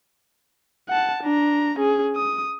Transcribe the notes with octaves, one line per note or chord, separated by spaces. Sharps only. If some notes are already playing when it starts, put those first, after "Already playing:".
F#5 A5
D4 A#5
C#4 G#4
D#6